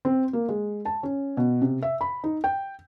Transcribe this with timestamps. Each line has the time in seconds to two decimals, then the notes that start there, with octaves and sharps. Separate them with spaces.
0.05 C4
0.33 A#3
0.49 G#3
0.85 A5
1.03 C#4
1.37 B2
1.62 C3
1.83 E5
2.01 B5
2.24 D#4
2.44 G5